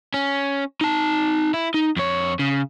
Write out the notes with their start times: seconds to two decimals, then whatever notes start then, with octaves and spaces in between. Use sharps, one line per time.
0.14 C#4
0.81 D#4 A5
1.54 E4
1.74 D#4
1.97 F2 C#5
2.39 C#3